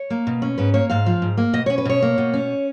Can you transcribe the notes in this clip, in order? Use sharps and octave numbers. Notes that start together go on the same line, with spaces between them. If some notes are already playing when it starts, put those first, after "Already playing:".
Already playing: C#5
A#3
B2
C#4
G#2 B4
A#3 C#5
G#2 F5
F3
G#2
A#3
B2 D#5
C#5
C#4
B4
B2 C#5
A#3
B2
C#4